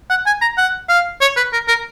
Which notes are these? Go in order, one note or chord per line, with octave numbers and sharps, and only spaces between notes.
F#5
G#5
A#5
F#5
F5
C#5
B4
A#4
A#4